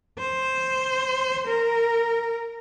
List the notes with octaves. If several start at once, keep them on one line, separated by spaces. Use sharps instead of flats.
C5
A#4